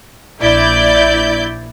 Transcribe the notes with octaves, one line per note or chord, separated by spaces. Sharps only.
A#1 E4 D5 G6